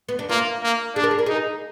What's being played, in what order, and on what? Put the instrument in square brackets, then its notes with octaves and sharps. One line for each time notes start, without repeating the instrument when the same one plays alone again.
[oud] B3
D4
[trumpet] A#3 [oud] F4
[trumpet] A#3
[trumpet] D4 [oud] G#4
[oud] A#4
G#4
A#4
[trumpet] D#4 [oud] G#4